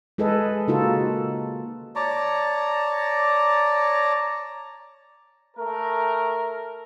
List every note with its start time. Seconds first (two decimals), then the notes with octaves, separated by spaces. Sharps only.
0.18 G#3 G#4 A4 B4 D#5
0.68 C#3 A#3 D#4 F4 F#4 A4
1.96 C#5 D5 A5 A#5
5.57 A3 A#4